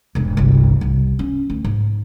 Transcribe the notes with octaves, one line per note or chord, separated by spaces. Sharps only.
E1 G#2
G1 C2
C2
C#4
D2
G#2